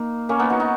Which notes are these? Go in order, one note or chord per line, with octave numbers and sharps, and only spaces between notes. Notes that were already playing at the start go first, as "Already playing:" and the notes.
Already playing: A#3 D#4
A#3 C#4
B3 D#4
D#4 F#4
D#4 F#4